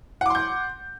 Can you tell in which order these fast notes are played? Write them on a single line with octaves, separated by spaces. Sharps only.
F#5 D6 C6 G6